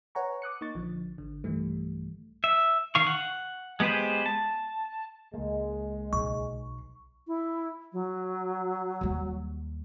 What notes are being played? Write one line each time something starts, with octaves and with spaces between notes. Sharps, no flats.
B4 C#5 F#5 G#5 A#5 C#6
D6 D#6 F#6 C#7
A#3 D#4 C#6 A6
A#1 D3 F3
G#1 D3
B1 G2 D#3 E3 G3 A3
E5
D#3 F5 C#6
F#5
G#3 B3 G4 B4 C5
A5
C#2 G#3 A#3
B1 C#6
E4
F#3
D#2 G3